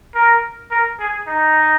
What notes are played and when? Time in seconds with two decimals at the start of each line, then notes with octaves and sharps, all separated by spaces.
0.15 A#4
0.71 A#4
0.99 G#4
1.27 D#4